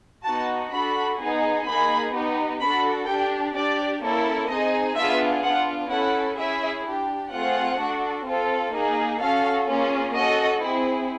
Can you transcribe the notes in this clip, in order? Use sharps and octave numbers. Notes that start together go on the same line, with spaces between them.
B3 D#4 F#4 A5
D4 F#4 A4 B5
B3 D#4 G#4
A#3 D#4 G#4 B5
B3 D#4 G4
D4 F#4 A4 B5
D4 G4 G5
D4 G4 D5
A#3 C#4 E4 A4
C4 D#4 G#4 D#5
B3 D4 F4 G#4 E5
B3 D4 F4 F#5
C#4 E4 A4 F#5
C#4 E4 G#4 E5
D4 G4
A3 C4 F4 G#4 F#5
D4 F#4 A4
C4 F4 A4
A#3 D#4 G#4
C#4 F#4 A4 F5
A#3 C#4 F4 G#4
C#4 F#4 A4 D#5
C4 E4 G#4